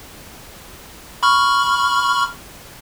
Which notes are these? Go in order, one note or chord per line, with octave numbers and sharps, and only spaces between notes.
B5 C#6 F6